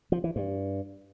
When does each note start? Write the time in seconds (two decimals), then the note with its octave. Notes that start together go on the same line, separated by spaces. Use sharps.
0.12 F3
0.24 E3
0.36 G2